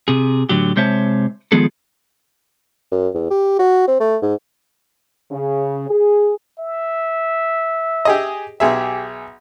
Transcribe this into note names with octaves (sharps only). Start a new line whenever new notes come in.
C3 G#4
A2 D3 F#3 G4
C3 G#3 C5 C#5 E5 A5
D#3 F3 G#3 B3 G#4 A4
F#2
E2
G4
F#4
C4
A3
G#2
C#3
G#4
E5
G4 G#4 D#5
B1 G4 G#4 E5